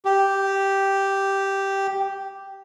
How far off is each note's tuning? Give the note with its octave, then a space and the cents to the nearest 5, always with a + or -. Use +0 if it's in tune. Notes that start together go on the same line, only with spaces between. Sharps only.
G4 -5